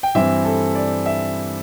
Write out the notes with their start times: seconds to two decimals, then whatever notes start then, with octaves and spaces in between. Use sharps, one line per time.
0.03 G5
0.15 G2 E3 C4 E5
0.45 A4
0.75 D5
1.06 E5